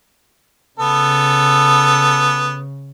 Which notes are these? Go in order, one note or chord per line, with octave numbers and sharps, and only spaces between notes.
C#3 B3 A4